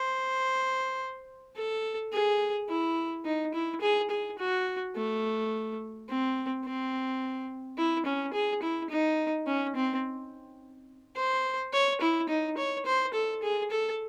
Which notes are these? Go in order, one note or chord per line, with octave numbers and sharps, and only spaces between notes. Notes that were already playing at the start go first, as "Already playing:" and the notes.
Already playing: C5
A4
G#4
E4
D#4
E4
G#4
G#4
F#4
A3
C4
C4
E4
C#4
G#4
E4
D#4
C#4
C4
C5
C#5
E4
D#4
C#5
C5
A4
G#4
A4